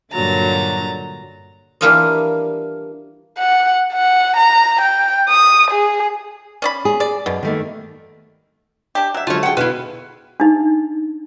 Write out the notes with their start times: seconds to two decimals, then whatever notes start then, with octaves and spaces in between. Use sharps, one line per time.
0.13 G2 A#2 D3 F#3 A#5 A6
1.81 E3 G3 A#3 D4 F4 D#5
3.39 F#5
3.94 F#5
4.37 A#5
4.81 G5
5.30 D#6
5.71 G#4
6.62 C#4 D5 B5
6.85 G#4
7.00 D5
7.26 F#2 B2
7.43 D#3 A3 A#3
8.95 D4 G4
9.14 F#3 E5 E6
9.27 D3 F3 F#3 G#3 A3 F4 C#5
9.43 G#4 F#5 G5 A5
9.57 B2 E4 F4 B4
10.40 D4 D#4